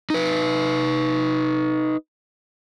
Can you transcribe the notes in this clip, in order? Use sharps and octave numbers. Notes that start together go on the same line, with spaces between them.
D#4 B4